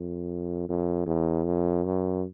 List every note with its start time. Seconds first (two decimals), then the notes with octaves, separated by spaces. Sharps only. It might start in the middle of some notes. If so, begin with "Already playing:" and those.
Already playing: F2
0.69 F2
1.07 E2
1.45 F2
1.85 F#2